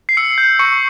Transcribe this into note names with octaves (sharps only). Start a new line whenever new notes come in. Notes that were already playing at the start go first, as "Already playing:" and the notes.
C7
E6 C#7
G6
C#6 C#7